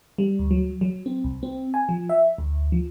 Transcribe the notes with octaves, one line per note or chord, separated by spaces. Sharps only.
G3
D2
F#3
F#3
C4
C2
C4
G#5
F3
E5
D2
F3